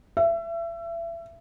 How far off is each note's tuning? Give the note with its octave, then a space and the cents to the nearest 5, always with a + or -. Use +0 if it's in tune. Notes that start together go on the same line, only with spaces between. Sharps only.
E5 +30